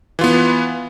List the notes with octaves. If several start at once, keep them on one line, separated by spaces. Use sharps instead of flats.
E3 B3 F4